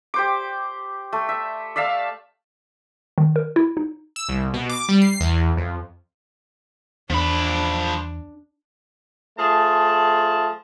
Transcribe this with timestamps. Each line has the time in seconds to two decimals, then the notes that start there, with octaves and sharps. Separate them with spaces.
0.14 G4 C5 D6
1.13 A3
1.29 E5
1.76 D5 E5 F5 A5
3.18 D#3
3.36 A#4
3.56 E4
3.77 D#4
4.16 E6
4.29 C2
4.54 B2
4.69 D6
4.89 G3
5.02 C7
5.20 E2
5.57 F2
7.10 E2 F3 D4 B5
9.38 F3 A3 G#4 A5